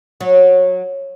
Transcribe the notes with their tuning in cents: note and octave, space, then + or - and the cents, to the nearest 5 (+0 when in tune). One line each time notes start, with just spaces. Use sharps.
F#3 -20